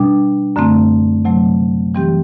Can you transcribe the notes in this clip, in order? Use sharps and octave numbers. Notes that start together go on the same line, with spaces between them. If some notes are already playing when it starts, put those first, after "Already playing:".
Already playing: B2 G3 D4
F#2 D3 A3 C4
C3 F#3 A3 C4
E3 G3 C4 G4